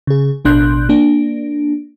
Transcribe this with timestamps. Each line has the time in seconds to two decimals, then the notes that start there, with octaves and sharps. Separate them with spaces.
0.07 C#3 G#4
0.45 A1 B2 D4 C6 F#6 G6
0.89 A#3 D4